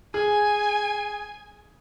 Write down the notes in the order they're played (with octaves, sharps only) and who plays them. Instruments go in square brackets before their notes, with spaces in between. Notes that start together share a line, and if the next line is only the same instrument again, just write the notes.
[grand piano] G#4 [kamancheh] G#5